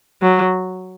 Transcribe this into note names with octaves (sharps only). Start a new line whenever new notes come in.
F#3